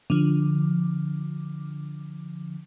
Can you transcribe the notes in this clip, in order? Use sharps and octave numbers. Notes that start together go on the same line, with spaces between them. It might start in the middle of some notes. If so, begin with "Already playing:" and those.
D3 F3